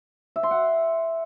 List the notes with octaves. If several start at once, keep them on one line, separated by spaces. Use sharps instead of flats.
E5
C6
F#5